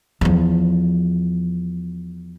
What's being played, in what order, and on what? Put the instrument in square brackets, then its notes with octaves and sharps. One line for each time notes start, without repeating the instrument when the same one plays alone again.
[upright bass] E2 F3